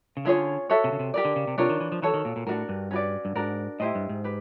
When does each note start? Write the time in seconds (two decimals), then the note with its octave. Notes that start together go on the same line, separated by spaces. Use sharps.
0.17 C#3
0.25 D3 C#4 F4 G#4 C#5
0.70 F#4 A4 C#5 E5
0.84 C3
0.92 C#3
0.99 C3
1.14 G4 A#4 D5
1.25 D3
1.36 C#3
1.47 C3
1.58 C3 D4 F4 A#4 C#5
1.69 D#3
1.80 E3
1.92 F3
2.02 E3 F#4 A4 C#5
2.14 D#3
2.25 A#2
2.36 A#2
2.47 A2 D4 F#4 A#4
2.69 G2
2.91 C#4 F#4 B4 D5
3.25 G2
3.36 G#2 D4 F#4 A#4
3.79 A2 E4 G4 C5 D#5
3.95 G2
4.09 G#2
4.24 G4 B4